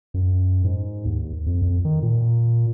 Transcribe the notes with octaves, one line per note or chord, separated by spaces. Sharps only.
F#2
G#2
D#2
F2
F2
D#3
A#2